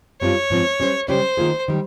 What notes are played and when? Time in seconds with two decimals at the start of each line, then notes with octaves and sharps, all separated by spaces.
0.21 G2 G3 C4 F4 C#5
0.50 G#2 F3 C4
0.80 G3 C#4 G4 C5
1.08 C#3 G3 C#4 G4 C5 C#5
1.37 D#3 A#3 F4 G#4
1.68 D#3 G3